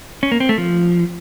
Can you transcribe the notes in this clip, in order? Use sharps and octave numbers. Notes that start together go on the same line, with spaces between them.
C#4
A#3
C4
A3
F3